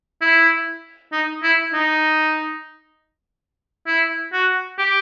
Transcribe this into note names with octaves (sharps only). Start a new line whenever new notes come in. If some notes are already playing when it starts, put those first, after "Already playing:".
E4
D#4
E4
D#4
E4
F#4
G4